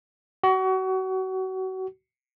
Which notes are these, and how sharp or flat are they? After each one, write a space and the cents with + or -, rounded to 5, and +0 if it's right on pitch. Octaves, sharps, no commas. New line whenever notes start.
F#4 +30